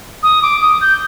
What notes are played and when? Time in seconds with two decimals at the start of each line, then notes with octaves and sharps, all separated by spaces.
0.23 D#6
0.42 D6
0.61 D#6
0.81 G6